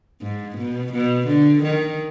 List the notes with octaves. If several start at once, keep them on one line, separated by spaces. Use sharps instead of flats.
G#2
B2
B2
D3
D#3